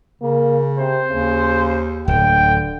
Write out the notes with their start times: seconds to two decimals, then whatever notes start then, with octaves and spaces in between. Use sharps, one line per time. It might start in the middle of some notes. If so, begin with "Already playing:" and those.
0.22 C#3 A#3
0.78 C3 C5
1.08 D#2 C#3
2.08 D1 D3 G5